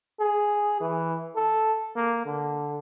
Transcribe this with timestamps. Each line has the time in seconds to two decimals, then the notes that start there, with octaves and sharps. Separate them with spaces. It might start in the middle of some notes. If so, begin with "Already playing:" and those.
0.20 G#4
0.80 E3
1.36 A4
1.96 A#3
2.26 D3